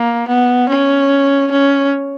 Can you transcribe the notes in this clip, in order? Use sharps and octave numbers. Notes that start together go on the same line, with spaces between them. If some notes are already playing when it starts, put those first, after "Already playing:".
Already playing: A#3
B3
C#4
C#4